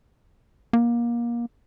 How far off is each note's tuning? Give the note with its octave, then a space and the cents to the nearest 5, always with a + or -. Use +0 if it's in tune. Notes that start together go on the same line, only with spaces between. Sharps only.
A#3 +25